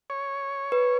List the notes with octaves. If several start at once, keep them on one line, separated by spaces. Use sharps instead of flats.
C#5
B4